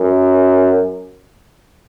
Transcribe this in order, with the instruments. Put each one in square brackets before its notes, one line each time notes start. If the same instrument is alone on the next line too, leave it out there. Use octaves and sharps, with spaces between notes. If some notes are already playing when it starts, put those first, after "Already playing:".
Already playing: [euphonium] F#2